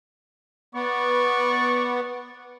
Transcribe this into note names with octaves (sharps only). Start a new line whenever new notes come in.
B3 D5 C#6